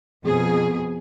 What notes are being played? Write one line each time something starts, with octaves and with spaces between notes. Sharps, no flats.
F2 B2 G#4